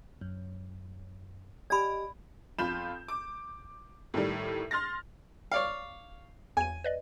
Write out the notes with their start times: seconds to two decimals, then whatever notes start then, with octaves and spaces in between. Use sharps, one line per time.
0.21 F#2
1.70 G4 D5 D#5 G#5 B5
2.58 F2 F4 B5 G6 E7
3.08 D6
4.14 A2 D#3 G3
4.71 C6 F6 A6 A#6
5.52 C#5 D5 F5
6.57 E2 G#5 D#7
6.84 B4 D5 D#5